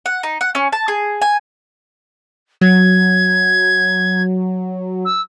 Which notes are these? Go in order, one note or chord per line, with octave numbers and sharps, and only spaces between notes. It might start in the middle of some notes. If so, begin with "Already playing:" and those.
F#5
D#4
F#5
C#4
A5
G#4
G#5
F#3 G#6
E6